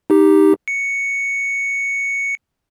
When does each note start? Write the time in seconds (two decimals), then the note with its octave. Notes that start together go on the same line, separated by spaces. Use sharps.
0.10 D#4 G4
0.68 C#7